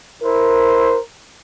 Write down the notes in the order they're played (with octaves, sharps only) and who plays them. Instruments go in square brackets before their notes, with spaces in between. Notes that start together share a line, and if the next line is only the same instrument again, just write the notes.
[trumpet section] E4 C5 [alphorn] A#4